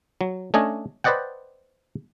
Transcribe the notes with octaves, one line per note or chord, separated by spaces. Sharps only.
F#3
A3 C#4 D4 D#5 G#5
B4 C5 D5 D#5 F#5 G5